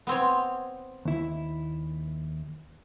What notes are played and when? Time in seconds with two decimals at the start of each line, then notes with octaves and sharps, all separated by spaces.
0.07 B3 C4 C#5
1.05 D#2 E4